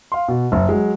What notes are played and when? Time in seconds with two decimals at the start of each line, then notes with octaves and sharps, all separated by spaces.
0.12 F5 C6
0.28 B2
0.52 F#1
0.69 F#3 G#3